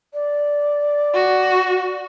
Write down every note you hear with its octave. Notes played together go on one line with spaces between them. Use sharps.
D5
F#4